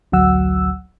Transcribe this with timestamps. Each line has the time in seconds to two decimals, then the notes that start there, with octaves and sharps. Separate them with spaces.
0.12 A1 D2 F#3 F#5 E6